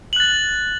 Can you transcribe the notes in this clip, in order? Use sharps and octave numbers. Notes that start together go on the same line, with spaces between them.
F#6 A6 F#7